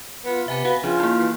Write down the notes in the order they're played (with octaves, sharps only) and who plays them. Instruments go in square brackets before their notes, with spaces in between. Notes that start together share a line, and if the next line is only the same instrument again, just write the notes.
[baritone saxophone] B3 [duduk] F4
[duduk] C3 [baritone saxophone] B3 [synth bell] E5 G#5 A#5
[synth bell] F#4 F5 F#5 [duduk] B4
[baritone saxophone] C#3 [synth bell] F3 D4 [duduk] F4
[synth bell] A#3 E4
[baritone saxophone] E3